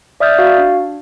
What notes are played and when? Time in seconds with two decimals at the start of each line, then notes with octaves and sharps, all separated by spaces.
0.20 D5 E5 D#6 F6 G6 A6
0.38 F#4 F5
0.58 D4